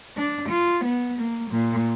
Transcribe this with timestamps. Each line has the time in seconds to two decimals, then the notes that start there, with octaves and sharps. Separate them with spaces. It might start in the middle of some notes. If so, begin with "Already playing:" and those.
0.17 D4
0.49 F4
0.83 B3
1.18 A#3
1.51 A#2